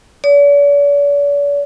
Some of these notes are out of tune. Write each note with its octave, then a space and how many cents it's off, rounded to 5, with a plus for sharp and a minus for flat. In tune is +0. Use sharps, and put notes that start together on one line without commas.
D5 -45